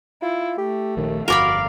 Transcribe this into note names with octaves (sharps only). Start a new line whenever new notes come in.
E4 F4
A3 G4
A#1 D#2 D#3
G1 F2 F#4 A#4 D5 F5 B5